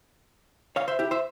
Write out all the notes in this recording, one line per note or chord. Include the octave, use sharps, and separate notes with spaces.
C#5 F5
C5 E5
E4 G4
C5 E5